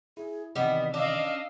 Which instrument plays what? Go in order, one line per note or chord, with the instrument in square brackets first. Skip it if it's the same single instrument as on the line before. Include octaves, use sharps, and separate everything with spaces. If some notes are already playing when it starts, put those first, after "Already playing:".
[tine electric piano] E4 [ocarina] G#4
[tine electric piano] C3 D#3 E3 [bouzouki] G3 B3 [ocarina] D#5
[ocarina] C#4 [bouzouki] D4 [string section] D#5 F5 E6